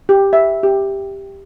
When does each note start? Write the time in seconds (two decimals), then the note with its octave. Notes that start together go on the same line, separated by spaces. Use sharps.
0.09 G4
0.33 E5
0.63 G4